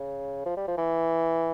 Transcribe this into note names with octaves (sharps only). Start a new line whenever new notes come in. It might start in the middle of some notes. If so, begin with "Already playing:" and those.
Already playing: C#3
F3
G3
F3
E3